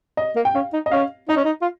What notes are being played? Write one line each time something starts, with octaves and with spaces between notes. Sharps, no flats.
D#5
A#3
G5
C#4 F5
D#4
D#5
C#4 F5
D#4 D#5
C#4
D#4
F4